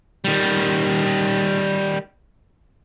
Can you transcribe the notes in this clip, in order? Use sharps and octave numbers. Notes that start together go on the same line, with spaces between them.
D#3 G3